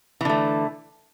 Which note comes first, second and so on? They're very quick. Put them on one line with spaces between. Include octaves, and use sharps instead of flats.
E3 D3 A3